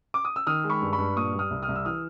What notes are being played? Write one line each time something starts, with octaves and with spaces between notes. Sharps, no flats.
D6
D#6
E6
D#3 D#6 F6
G#3
B5 C#6
G2
B5 C#6
G2
A#2 C#6 D#6
G3
D#6 F6
C2
D#6 F6
C2
E6
E3 D#6 F6